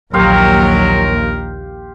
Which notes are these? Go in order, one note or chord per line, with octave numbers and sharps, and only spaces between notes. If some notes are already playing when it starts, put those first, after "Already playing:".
A#1 D#2 F#3 G4 A#4 F5 C6